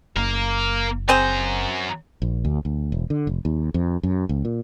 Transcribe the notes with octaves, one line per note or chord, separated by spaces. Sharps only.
F#1 A#3 A#4
F#2 C4 G#4 C5 A#5
A#1
D2
D2
E1
D3
F1
D#2
F2
F#2
C#2
A#2